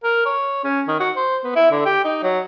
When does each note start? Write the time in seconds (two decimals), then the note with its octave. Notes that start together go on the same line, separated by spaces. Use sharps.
0.03 A#4
0.26 C#5
0.64 C#4
0.88 D#3
1.00 F#4
1.17 C5
1.44 B3
1.56 E4
1.71 D3
1.85 G4
2.04 D#4
2.23 F#3